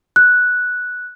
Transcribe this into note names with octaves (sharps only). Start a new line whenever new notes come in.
F#6